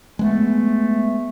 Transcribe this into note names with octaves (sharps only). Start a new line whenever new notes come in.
G#3 A3 B3